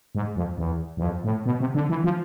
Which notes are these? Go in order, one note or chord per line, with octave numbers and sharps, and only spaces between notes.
G#2
F2
E2
E2
F2
A2
B2
C3
D3
E3
F3